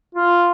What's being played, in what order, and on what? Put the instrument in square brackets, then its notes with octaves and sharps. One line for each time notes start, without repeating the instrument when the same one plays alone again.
[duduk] F4